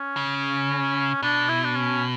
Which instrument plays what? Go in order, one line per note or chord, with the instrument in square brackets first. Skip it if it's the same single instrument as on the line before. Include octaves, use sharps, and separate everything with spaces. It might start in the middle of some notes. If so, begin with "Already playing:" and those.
Already playing: [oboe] C#4
[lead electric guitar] C#3
[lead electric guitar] B2 [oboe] D4
[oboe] E4
D4
C#4